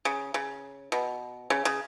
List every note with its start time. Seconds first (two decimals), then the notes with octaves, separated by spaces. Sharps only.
0.05 C#3
0.34 C#3
0.92 B2
1.50 C#3
1.65 C#3